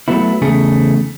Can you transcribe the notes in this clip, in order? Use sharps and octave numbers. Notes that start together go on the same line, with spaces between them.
F#3 A3 B3 E4
E2 C#3 A3 G#4